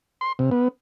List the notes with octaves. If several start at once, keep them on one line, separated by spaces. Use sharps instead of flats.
C6
C3
B3